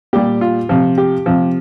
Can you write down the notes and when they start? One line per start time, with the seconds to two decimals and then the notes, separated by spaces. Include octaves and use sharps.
0.13 A#2 G3 G4
0.41 F4
0.69 C3 F3
0.98 G4
1.26 C3 F3